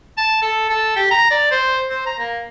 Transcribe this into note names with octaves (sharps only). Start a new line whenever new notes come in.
A5
A4
A4
G4
A#5
D5
C5
C5
A#5
A#3